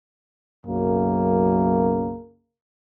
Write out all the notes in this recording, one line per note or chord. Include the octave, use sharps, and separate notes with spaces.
B1 F#2 C#3 A#3